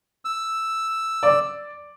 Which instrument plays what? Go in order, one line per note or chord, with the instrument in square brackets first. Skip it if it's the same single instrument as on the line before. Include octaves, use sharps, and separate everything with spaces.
[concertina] E6
[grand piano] D5 D6